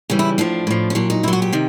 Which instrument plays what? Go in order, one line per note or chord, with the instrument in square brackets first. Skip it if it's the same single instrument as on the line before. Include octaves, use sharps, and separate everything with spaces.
[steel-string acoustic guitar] C#3 E3 G3
E4
A2 F3 D4
A2 F3
C#4
A#2 F#3 D4
D#4
A#2 E4
F#3
F#4
G4
C3 D#3